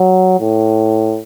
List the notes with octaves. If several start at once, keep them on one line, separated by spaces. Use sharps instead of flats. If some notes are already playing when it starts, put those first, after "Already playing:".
Already playing: F#3
A2